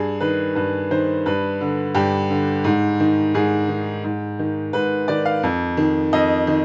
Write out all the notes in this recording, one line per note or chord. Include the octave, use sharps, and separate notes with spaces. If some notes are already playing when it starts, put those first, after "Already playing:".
Already playing: G2 G#4
D#3 B4
G2 B4
D#3 C5
G2 B4
D3
G2 G4
D3
G#2
D#3
G#2 G#4
D#3
G#2
D#3
G#2 B4
D#3 D5
F5
F2
D#3
F2 D#5
D#3